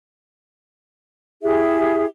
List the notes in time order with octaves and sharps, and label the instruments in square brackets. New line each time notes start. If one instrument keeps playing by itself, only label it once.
[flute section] E4 G4 G#4 E5